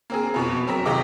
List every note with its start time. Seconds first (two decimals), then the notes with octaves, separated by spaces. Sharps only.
0.10 A#3 C4 G#4
0.34 F2 B2 B3
0.67 F#3 C4 A#4 A#5 B6
0.86 D#2 C3 G4 D#5 D6